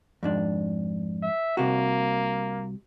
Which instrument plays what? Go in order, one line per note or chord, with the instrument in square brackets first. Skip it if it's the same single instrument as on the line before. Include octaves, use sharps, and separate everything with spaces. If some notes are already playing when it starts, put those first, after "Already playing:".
[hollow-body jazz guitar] F2 G#2 D4
[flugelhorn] E5
[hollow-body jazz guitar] C2 C3 F#4 [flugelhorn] A#3